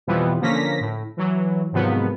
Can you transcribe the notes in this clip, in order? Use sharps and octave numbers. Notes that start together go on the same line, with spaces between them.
F2 B2 E3 F3 G3 B3
D3 F3 A#3 C#4 A#6 B6
A2
E3 F#3
G#2 C3 D#3 F3 F#3 B3